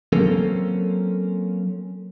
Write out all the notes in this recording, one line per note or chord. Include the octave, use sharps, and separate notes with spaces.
F#3 A#3 C4 C#4 A4 A#4